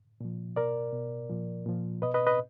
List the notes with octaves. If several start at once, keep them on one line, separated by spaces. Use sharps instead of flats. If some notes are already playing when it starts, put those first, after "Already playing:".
A#2 F3
B2 A#4 D5
B2
A#2 F3
A#2 F3
B2 B4 D#5
B4 D#5
B4 D#5